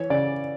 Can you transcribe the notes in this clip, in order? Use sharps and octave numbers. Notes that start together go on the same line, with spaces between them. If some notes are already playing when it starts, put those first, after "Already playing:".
Already playing: E3 C#5
C#3 D5